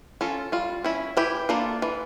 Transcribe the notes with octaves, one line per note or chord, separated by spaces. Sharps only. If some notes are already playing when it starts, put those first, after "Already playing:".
C#4 F4 A4
G3 F4
C#4 E4
E3 E4 G4
A#3 D4 F4 A4
E3